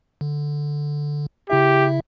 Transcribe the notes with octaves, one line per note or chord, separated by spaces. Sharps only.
D3
C#3 E4 G4 E5